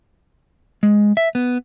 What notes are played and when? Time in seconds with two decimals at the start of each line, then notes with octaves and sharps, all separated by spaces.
0.83 G#3
1.17 E5
1.35 B3